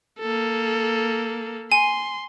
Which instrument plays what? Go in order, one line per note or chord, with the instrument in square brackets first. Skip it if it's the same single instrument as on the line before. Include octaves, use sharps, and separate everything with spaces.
[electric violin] A#3 A4
[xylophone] G#5 [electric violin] C6